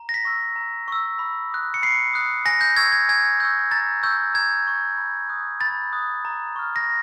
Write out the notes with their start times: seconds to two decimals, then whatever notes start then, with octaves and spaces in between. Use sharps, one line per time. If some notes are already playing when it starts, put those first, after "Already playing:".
Already playing: A#5
0.09 A#6
0.14 B6
0.25 C#6 E6
0.56 A#5
0.88 C#6 E6
1.19 B5
1.51 D#6 F#6
1.74 C#7
1.82 B5 C7
2.13 D#6 F#6
2.46 G#5 A#6
2.61 G6
2.76 C#6 E6 G6 G#6
2.92 G#6
3.09 G#5 G#6
3.40 C#6 E6 G6
3.71 A#5 A6
4.03 C#6 E6 G6
4.34 A#5 G#6
4.67 C#6 E6
4.97 B5
5.29 D#6 F#6
5.61 B5 A6
5.93 D#6 F#6
6.25 A#5
6.56 C#6 F6
6.76 A#6